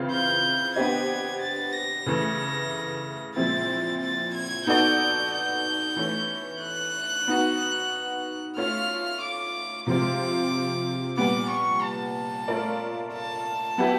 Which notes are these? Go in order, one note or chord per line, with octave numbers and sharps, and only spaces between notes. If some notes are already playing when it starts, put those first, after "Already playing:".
Already playing: C#3 E3 C4 F4
G6
B3 D4 G4 C5 D#5 G#6
A6
A#6
C#3 E3 A3
A#2 F3 G#3 C4 E4 A6
A6
G#6
B3 D#4 F#4 A4 D5 G6
G6
E3 A3 C#4
F#6
B3 D#4 F#4
A3 C#4 F4 F6
D6
C3 F3 G#3 C4 F4 D6
A#2 G3 B3 D6
C#6
A5
A3 C#4 F4 A#4 D5
A5
F#3 B3 E4 G4